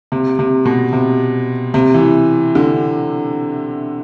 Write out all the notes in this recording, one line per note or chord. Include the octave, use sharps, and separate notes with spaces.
C3
C3
B2
C3
C3
E3
D3